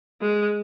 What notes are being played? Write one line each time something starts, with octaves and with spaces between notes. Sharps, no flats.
G#3